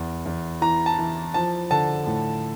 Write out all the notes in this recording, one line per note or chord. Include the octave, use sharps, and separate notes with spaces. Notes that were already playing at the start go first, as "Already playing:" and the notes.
Already playing: E2
E2
E3 A#5
A5
E3
F3 A5
D3 A5
A2